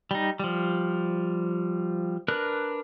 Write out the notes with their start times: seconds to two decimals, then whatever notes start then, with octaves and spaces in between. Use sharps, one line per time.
0.11 G3 D#4
0.40 F3 G3
2.28 D4 A#4 B4 F#6